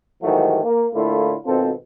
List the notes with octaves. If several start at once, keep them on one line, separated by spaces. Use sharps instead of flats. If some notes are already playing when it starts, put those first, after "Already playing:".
G#2 D#3 E3 F#3 G3 A3
A#3
A2 D3 A3 A#3 E4 F4
G#1 B2 C4 F4 A4